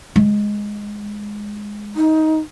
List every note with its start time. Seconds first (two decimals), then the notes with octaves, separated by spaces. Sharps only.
0.16 G#3
1.96 D#4